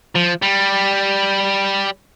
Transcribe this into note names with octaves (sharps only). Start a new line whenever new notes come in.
F3
G3